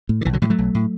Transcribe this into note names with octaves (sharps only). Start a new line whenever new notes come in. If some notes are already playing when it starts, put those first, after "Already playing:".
A2
D3
B1 E3
D3 F#3
A2 E3 G3
F#3 A3
B1
A2